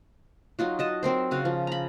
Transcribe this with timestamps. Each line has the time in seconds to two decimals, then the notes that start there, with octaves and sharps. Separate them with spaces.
0.59 F#3 D#4 F4 F#4
0.79 F#4 D#5 A5
1.03 F#3 C4 A#4 C5
1.31 C#3 F#4 F5
1.45 F3
1.67 A#5 B5